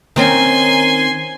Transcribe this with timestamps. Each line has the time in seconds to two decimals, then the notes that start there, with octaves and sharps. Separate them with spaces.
0.16 D#3 C4 C#4 G#5 C6